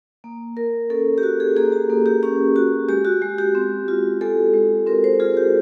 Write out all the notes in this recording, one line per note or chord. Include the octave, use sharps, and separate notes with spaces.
A#3
A#3 A#4
C#4 A4
G4
F#4
G#4
A#3 G#4
G4
A#3
G4
C#4 G4
F#4
G#3 G4
F#4
G#3
G4
C4
F4
G#3 A4
G#3
C4 A#4
C5
F4 G#4
G4